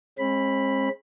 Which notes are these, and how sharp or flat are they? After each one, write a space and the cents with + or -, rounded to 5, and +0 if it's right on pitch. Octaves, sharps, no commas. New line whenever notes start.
G#3 +0 C4 +45 B5 +0